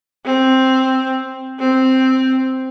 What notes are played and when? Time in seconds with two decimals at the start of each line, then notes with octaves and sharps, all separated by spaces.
0.25 C4
1.59 C4